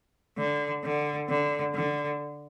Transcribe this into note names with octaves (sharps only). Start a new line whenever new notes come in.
D3
D3
D3
D3